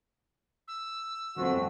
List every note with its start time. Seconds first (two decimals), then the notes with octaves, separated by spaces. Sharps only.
0.68 E6
1.36 G1 F2 D#3 A3 C4 F#4